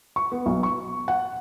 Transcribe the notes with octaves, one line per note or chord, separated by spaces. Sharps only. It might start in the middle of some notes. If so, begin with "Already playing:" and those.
C#6
B3
B1
C#6
F#5